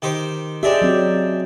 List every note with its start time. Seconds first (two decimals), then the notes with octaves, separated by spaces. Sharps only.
0.02 D#3 G4 C5
0.63 G#3 D4 G4 D5 E5
0.82 F#3 C4